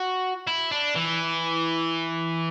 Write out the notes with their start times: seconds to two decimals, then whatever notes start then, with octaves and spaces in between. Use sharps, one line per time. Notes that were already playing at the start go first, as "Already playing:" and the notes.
Already playing: F#4
0.47 E4
0.71 D4
0.96 E3